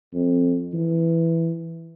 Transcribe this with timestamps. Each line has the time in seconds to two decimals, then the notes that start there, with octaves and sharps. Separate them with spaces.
0.14 F2
0.74 E3